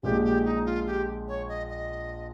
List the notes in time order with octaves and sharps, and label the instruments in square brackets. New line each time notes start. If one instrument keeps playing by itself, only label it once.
[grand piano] A#1 A#2 G#3 [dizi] G4
[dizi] G4
D#4
F4
G4
C#5
D#5
D#5